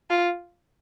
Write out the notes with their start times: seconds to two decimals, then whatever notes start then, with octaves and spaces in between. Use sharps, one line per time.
0.10 F4